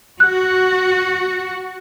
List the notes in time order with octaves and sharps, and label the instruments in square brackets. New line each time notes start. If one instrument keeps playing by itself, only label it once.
[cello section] F#4 [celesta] F#6